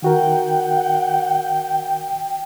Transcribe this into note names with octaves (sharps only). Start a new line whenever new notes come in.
D#3 F#4 A#4 F#5 G5